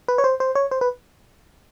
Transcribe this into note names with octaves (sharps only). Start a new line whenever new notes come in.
B4
C#5
C5
C5
C#5
C5
B4